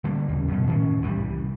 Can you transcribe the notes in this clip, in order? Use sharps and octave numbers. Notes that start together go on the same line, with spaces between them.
D3 G3 A#3
D#2 C#3
F#2 B2
A2 D#3 C4 C#4
C2 E3 F#3 G3